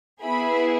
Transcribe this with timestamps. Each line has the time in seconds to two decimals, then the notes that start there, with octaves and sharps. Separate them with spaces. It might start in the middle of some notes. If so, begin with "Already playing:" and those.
0.22 B3 E4 G#4 B5